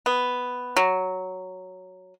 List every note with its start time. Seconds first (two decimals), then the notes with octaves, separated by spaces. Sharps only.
0.06 B3
0.76 F#3